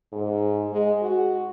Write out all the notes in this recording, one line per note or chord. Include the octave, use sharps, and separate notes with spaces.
G#2
G#3
F#4